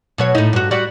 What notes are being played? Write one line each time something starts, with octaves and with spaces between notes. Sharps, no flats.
B2 F#3 C#5
A2 D#4
G2 F#4
G3 F#4 D5